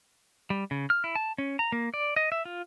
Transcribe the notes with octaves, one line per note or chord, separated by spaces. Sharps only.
G3
C#3
F6
E4
A5
C#4
A#5
A#3
D5
D#5
E5
F4